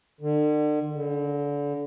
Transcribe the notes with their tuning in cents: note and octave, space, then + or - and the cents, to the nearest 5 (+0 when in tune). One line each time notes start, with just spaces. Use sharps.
D3 +40
D3 -30